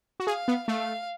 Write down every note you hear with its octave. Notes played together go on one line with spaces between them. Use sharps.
F#4
G#4 F5
B3
A3 F5